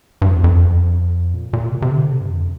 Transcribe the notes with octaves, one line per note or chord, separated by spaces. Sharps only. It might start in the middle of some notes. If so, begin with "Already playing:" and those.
G2
F2
E2
F2
A#2
A#2
C3
C3
D3
C3
G2
F2